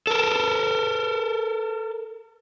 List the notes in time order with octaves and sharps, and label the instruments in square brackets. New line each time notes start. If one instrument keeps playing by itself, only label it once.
[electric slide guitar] A4 A#4